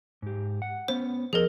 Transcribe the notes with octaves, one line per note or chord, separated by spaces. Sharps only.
G#2 G4
F#5
B3 C#4 C5
F3 G#4 A#4 C5 D#5